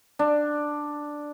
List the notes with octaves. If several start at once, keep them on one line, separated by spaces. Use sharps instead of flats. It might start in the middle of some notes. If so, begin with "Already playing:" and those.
D4